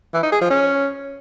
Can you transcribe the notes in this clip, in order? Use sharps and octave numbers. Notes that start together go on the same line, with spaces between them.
E3
D#4
G#4
F3
C#4